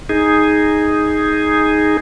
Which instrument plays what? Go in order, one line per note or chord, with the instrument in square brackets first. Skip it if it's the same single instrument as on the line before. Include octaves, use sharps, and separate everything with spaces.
[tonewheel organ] D#4 G#4